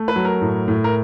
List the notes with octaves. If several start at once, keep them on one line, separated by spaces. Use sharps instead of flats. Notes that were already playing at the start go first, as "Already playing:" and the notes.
Already playing: A3
B4
F#3
A#4
A2
A2
A#4